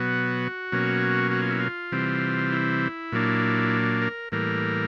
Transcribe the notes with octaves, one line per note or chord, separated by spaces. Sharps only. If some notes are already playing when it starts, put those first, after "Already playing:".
Already playing: B2 F#3 B3 F#4
B2 F#3 A#3 C#4
F#4
F4
E4
F4
C3 E3 G3 C4
E4
A#2 F#3 A#3 D4
A#4
A2 E3 G3 A#3 A#4